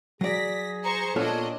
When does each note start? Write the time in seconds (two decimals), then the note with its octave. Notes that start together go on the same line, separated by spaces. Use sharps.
0.21 F#3 G#4 D5 A#6 B6
0.84 C5 A#5 C#6
1.16 A#2 B3 D4 F4 A4 C#5 D#5